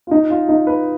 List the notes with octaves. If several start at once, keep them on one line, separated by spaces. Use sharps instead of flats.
F4
D#4
F4
D#4
B4